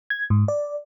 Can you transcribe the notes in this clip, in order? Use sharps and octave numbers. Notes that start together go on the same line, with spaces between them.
G#6
G#2
D5